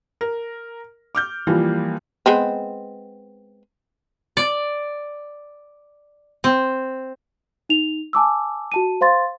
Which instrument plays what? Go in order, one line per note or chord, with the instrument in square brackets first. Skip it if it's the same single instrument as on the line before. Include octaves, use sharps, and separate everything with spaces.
[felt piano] A#4
D6 F6 G6
E3 F3 G3 A#3 F4
[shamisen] G#3 B3 C4
[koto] D5
C4
[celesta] D#4 F7
G#5 A5 D6 E6
F#4 A5 D#7
C5 F5 C6 A6